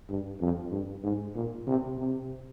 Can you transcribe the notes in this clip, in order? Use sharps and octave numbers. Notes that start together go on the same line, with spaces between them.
G2
F2
G2
G#2
A#2
C3
C3